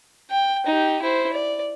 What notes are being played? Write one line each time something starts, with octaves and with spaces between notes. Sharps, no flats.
G5
D#4 G4
E4 C5
D5